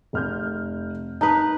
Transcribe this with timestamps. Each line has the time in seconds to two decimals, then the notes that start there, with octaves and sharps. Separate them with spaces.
0.13 F1 F6 G6
1.21 D#4 B4 A5 D#6